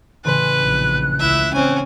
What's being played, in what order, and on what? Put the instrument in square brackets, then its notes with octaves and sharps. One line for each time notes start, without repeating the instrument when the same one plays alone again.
[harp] A1 C#3 C6 [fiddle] B4 [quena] F#6
[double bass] A#1
[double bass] C#2 [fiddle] E4 E5
[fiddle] C4 G#5 [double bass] C#4